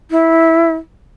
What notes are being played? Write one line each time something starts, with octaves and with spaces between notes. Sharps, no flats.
E4